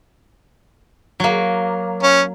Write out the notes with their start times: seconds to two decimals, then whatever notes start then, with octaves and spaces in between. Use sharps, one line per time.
1.20 F#3 A#3
2.03 C#4